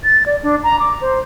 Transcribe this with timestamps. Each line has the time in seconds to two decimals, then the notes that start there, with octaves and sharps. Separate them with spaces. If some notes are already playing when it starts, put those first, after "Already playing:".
0.04 A6
0.26 D5
0.43 D4
0.63 A#5
0.80 D6
1.01 C5